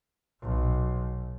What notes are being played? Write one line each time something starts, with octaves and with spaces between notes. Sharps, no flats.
B1